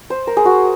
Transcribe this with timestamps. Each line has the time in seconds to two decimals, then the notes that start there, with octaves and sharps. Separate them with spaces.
0.10 C5
0.27 A#4
0.37 G#4
0.45 F#4